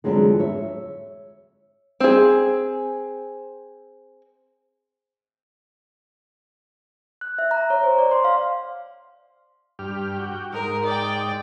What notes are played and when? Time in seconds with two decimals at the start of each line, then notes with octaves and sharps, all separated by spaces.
0.04 F2 D3 E3 F#3 G#3 B3
0.39 C#5 E5
2.00 C4 G#4
7.21 F#6
7.39 E5
7.51 A#5
7.70 C#5
7.83 C5
7.98 D5
8.11 C6
8.24 F5
9.79 G2 G4 F6
10.19 F#4 G5
10.53 G#2 D#4 A#4
10.85 D5 G5